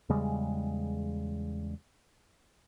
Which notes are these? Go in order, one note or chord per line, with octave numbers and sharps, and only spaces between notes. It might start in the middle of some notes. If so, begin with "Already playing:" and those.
E2 C#3 G3 G#3